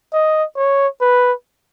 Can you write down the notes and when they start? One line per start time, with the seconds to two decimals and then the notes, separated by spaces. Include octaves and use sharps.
0.13 D#5
0.56 C#5
1.01 B4